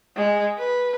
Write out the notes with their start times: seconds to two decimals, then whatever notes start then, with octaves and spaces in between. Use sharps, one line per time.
0.16 G#3
0.58 B4